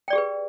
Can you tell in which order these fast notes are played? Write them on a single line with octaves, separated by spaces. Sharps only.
G5 D5 G4 G#4 B4